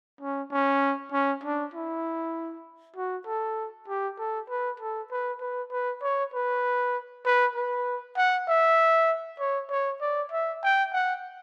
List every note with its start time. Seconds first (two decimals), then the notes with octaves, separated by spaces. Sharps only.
0.21 C#4
0.51 C#4
1.12 C#4
1.43 D4
1.74 E4
2.96 F#4
3.26 A4
3.88 G4
4.18 A4
4.49 B4
4.80 A4
5.11 B4
5.41 B4
5.72 B4
6.03 C#5
6.34 B4
7.26 B4
7.56 B4
8.17 F#5
8.48 E5
9.39 C#5
9.70 C#5
10.01 D5
10.32 E5
10.63 G5
10.93 F#5